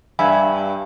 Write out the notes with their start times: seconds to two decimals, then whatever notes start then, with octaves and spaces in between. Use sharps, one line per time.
0.19 G2 E5 G#5 B5